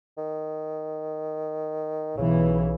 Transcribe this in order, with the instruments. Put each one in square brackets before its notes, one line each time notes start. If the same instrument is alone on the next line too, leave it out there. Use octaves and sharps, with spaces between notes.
[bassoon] D#3
[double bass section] B1 E3 [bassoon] C#3